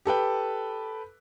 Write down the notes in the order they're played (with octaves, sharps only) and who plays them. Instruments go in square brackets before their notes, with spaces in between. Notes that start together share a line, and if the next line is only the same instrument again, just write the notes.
[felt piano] G4 A4 B4 G5